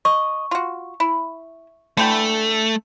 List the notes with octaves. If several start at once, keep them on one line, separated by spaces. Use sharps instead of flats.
D#5 C#6
F4 F#4
E4
D3 E3 A3 G5